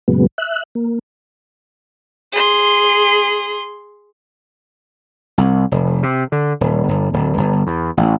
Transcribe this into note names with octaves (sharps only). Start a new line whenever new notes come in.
F#2 A#2 C#3 F#3 G#3 B3
E5 F#6
A#3
G#4 C6
C2
F1
C3
D3
D#1
G1
D1
G1
E2
A1